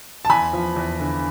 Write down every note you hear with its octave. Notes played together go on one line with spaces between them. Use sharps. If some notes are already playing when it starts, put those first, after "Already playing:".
A5
E2 G#5 B5
F3
E2
D3